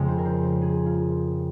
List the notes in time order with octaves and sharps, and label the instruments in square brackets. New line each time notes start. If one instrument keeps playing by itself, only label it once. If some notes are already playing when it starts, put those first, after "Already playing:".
Already playing: [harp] F2 C#3 G#3
C5
A#4
C5
C5
G#4
F4